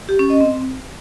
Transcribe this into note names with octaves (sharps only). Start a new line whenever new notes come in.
G4
C#4
D#5
C4